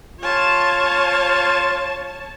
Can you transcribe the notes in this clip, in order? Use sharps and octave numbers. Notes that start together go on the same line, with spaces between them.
F4 C#5 A5